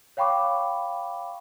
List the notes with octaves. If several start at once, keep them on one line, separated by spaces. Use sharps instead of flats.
C#5 F5 G5 B5 C#6 D6